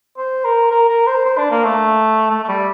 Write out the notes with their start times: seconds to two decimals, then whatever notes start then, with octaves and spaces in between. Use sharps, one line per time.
0.18 C5
0.45 A#4
0.71 A#4
0.89 A#4
1.07 C5
1.25 C5
1.38 D4
1.51 A#3
1.64 A3
2.30 A3
2.44 A3
2.48 G3